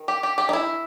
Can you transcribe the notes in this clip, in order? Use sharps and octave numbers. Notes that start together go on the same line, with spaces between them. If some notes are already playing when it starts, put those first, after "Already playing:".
Already playing: D#3
G4
G4
G4
D#4
E4